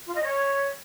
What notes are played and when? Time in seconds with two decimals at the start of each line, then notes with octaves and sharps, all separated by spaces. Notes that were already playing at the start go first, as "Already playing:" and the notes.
0.07 F4
0.15 D#5
0.23 C#5